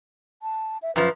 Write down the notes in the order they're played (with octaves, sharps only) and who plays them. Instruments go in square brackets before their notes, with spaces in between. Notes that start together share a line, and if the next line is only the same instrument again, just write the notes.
[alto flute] A5
E5
[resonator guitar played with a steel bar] F#2 F3 [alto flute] B4